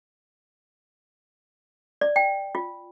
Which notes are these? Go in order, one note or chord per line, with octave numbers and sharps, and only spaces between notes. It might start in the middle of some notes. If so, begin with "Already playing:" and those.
D5
G5
F4